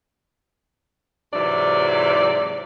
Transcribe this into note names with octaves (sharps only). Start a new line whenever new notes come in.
G#2 C3 E3 F#3 D5